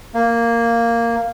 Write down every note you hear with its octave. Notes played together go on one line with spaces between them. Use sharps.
A#3